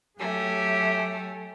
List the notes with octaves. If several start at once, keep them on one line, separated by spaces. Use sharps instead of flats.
F#3 A3 G4 G#5